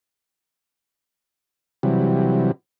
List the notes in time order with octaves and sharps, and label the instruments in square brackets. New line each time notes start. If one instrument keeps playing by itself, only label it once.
[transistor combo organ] C3 E3 F#3 G3